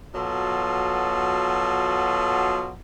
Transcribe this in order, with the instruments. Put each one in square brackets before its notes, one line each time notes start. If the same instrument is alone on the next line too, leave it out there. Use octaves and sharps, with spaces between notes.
[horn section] B2 F#3 F4 A4